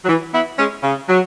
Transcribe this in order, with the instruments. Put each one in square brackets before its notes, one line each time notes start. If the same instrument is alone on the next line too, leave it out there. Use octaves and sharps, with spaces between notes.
[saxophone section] F#3
E3
B3 E4
G#3 C#4
C#3
F#3